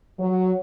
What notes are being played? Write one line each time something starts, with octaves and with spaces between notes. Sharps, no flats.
F#3